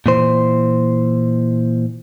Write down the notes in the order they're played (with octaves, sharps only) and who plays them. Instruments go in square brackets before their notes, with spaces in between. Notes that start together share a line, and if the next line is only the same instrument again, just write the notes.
[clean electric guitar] A#2 E3 C5